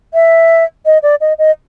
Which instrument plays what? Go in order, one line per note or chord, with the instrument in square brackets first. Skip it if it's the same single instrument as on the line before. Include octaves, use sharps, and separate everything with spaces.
[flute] E5
D#5
D5
D#5
D#5